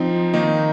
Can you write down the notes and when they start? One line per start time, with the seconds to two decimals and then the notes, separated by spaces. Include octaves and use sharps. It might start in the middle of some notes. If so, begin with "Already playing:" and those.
Already playing: F3 C4 D#4
0.34 D#3 A#3 D#4